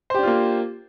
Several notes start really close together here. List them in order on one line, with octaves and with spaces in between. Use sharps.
C5 G4 D4 F4 A#3